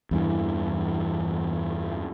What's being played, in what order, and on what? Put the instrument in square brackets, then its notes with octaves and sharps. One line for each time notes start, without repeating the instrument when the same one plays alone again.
[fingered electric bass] E2 G2 E3